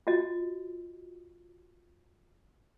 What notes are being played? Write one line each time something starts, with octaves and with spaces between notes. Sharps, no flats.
F4 F#4 D#5